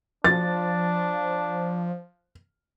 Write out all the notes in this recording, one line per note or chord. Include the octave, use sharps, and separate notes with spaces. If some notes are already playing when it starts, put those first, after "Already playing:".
F3 D4 A6